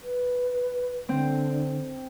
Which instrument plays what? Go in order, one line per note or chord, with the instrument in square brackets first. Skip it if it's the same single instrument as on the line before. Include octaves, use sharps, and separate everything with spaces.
[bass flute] B4
[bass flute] D3 [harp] C4